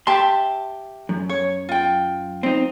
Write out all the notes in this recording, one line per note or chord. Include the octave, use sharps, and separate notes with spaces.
G4 E5 A5 C6
F#2
C#5
F4 G5
C4 D#4